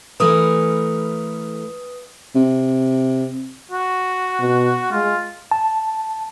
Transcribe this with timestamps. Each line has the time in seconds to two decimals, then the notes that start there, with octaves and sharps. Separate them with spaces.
0.20 E3 A3 A#4 B4 D#6
2.35 C3
3.71 F#4
4.40 B2
4.92 G#3 F4
5.51 A5